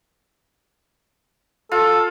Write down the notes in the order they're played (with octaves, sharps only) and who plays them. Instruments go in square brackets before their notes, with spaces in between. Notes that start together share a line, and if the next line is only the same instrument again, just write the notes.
[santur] F4 [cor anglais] A4